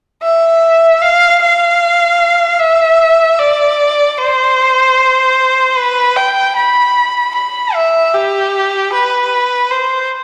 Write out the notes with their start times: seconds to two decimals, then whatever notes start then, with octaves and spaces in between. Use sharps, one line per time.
0.23 E5
1.02 F5
1.42 F5
2.60 E5
3.39 D5
4.18 C5
5.77 B4
6.16 G5
6.56 B5
7.35 B5
7.74 E5
8.14 G4
8.93 B4
9.71 C5